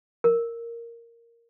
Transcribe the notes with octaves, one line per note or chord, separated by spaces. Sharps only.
A#4